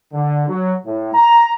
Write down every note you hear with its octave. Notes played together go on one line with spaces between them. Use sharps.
D3
F#3
A2
A#5